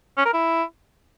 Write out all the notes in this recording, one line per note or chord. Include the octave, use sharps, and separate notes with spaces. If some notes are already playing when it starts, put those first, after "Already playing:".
C#4
A#4
E4